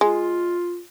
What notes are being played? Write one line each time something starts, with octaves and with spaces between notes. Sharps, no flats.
G#3 F4